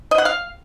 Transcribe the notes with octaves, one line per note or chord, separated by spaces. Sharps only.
D#5
F#5
F5